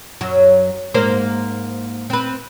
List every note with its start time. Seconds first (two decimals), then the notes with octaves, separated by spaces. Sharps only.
0.21 F#2 F#3
0.94 G#2 A#3 C5
2.10 C4 B4